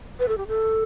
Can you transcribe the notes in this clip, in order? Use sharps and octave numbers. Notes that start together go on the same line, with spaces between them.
B4
A4
G4
A4